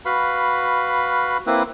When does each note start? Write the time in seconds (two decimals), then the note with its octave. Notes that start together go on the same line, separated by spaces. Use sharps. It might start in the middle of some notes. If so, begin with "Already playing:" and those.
0.05 F#4 B4 F5 B5
1.47 A#3 C4 E4 B4